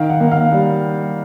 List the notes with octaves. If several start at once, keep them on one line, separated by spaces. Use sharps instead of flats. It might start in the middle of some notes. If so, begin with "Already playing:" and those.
Already playing: D#3 F5
F#5
A#3
F5
G3